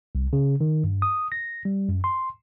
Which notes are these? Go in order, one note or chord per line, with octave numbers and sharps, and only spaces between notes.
C2
C#3
D#3
G2
D#6
A#6
G3
F#2
C6